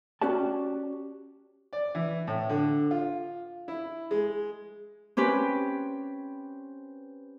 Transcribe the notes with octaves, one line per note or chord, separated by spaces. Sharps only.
C#4 F#4 G4 D5 A5
D5
E3
A2
D3
F4
E4
G#3
C4 C#4 G4 B4